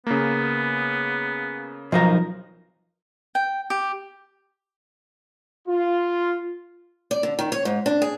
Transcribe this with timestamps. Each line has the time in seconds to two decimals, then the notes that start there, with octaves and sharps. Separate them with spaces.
0.07 C#3 A#3 B3
1.92 B1 F3 D#4 A#4
3.35 G5
3.70 G4
5.68 F4
7.11 D5
7.23 D3
7.39 D#3
7.52 C#5
7.65 G#2
7.86 D4
8.02 G#4